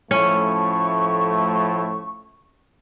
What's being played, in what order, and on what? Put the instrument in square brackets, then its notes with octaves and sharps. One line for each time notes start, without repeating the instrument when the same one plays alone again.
[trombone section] A2 F3 A3 [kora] C#4 [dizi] C#6